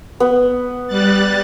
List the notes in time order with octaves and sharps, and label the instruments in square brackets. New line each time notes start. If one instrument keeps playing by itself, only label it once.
[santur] B3
[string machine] G3 F#6 A6